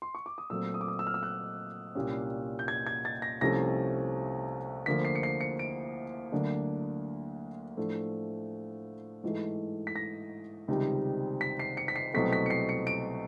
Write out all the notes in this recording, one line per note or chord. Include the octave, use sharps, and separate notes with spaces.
C6
C#6
D6
D#6
A#2 F#3 A3 C4 E6
D#6
D6
D#6
E6
F6
E6
F#6
C2 A#2 G3 A#3 C#4
G6
G#6
G#6
A6
A#6
C2 C3 F3 A3 C#4 A#6
D2 D3 F3 A#3 B6
C7
C#7
C7
C#7
D7
D2 D3 F#3 A#3 D4
A2 F3 A3 D4
G#2 E3 A3
B6
A#6
C#2 C3 D#3 G3
B6
C7
C#7
B6
C7
C2 B2 F#3 A3 C4 B6
B6
C#7
C7
C#7
D7